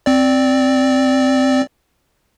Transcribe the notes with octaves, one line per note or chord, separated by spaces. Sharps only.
C4 D5